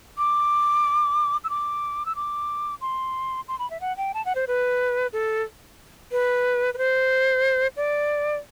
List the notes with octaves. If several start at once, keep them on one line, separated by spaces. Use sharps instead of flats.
D6
E6
D6
E6
D6
C6
C6
B5
E5
F#5
G5
A5
F#5
C5
B4
A4
B4
B4
C5
D5